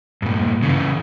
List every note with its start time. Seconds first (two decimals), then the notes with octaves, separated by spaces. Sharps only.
0.22 G2 A#2
0.62 C#3 E3